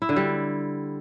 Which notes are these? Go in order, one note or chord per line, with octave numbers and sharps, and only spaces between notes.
E4
D3
G3